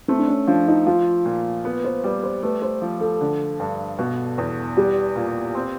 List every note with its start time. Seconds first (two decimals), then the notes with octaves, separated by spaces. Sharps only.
0.08 A3 C4
0.19 D4
0.28 C#4
0.47 F3 D4
0.68 D#4
0.87 F3 F4
1.25 A#2
1.65 B3 B4
1.85 C5
2.04 G3 B4
2.23 C5
2.43 A3 B4
2.62 C5
2.82 F3
3.01 A4
3.21 D3
3.60 G2
3.99 B2
4.38 E2
4.77 G3 G4
5.16 A#2
5.55 C4